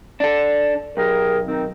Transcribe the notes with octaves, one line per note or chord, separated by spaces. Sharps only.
D4 A4
B1 G4 G#4 A#4
D#3 C4 D#4